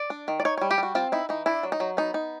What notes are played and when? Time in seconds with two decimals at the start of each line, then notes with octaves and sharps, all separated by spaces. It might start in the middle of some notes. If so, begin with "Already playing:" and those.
Already playing: D5
0.10 D4
0.28 D#3
0.40 D5
0.45 D#4 C#5
0.57 C#5
0.61 G3
0.71 G4
0.78 G3 F#4
0.95 C4 F4
1.12 D#4 E4
1.29 E3 D#4
1.46 D4 E4
1.63 F#3
1.72 D#4
1.80 F#3
1.97 B3 D#4
2.14 D#4